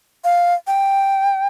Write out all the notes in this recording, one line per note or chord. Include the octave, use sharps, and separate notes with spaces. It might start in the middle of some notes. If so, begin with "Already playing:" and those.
F5
G5